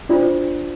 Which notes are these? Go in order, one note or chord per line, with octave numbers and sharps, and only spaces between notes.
D4 F4 C5 D5